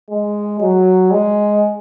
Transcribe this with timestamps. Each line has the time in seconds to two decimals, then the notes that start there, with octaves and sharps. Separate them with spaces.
0.10 G#3
0.60 F#3
1.11 G#3